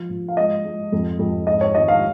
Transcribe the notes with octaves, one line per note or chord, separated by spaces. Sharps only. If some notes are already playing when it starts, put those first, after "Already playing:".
Already playing: F3
F3
F5
G#3 D#5
G#3
F2
F2
G#2 D#5
C#5
G#1 D#5
F5